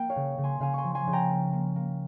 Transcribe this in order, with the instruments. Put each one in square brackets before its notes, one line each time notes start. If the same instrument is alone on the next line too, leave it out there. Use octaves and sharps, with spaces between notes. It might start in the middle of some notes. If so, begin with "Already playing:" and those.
Already playing: [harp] A#3 G5
C#5 F5
C#3
C#3
G#5 C6
C#3 F5 G#5
G#5 C6 C#6
F3
G#5 C6
C#3
G5 A#5
A#3
A#3
A#3